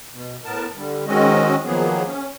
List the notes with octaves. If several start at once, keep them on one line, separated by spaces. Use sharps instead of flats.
B2
A2 B3 A#4 A5
D3 G3
D#3 G#3 C4 C#4 F#4 D#5
D#3 F3 F#3 A#3 B3 G#4
C#4